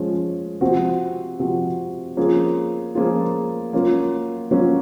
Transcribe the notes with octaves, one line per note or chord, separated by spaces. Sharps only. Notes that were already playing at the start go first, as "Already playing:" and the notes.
Already playing: F3 G#3 C#4
C3 F3 C4 F#4
C3 F3 C4 F#4
F3 A#3 C#4 F4 G#4
F3 A#3 C#4 F4 G#4
F#3 A#3 C#4 F4
F#3 A#3 C#4 F4